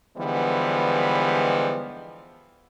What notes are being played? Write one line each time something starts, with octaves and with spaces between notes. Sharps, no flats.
D3 E3 F3 G3 G#3 B3